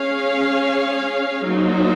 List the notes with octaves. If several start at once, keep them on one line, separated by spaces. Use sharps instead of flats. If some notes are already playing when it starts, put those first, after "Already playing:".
Already playing: C#4 G#4 C#5 F5
F#3 A#3 D#4 F#4 C5